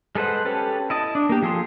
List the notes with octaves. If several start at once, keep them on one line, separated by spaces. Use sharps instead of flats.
G#3 A4 B4 C5 F#5
C#4 G4 A4 B4
E4 D#5 A5
D4
A#3 G4
F3 G#4 A4 C6